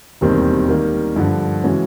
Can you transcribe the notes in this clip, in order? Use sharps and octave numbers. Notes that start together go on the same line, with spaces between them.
E1 D#2 D#3 G3 C4
D#3 G3 A#3
G2 D3 F3
C#3 E3 G#3 C#4 F#4